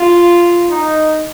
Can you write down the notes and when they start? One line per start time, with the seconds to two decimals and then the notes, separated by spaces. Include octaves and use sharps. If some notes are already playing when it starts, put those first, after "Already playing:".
Already playing: F4
0.69 D#4